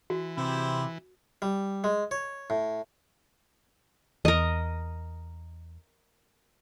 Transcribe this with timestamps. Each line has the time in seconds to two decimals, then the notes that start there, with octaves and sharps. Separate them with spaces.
0.10 E3 F#4
0.37 C3 E4 G4 C5
1.42 G3
1.84 G#3
2.11 C#5
2.50 A2
4.25 E2 A#4 D#5